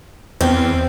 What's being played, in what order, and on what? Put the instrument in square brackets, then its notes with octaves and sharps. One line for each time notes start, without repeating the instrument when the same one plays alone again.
[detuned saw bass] E2 [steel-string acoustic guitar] C4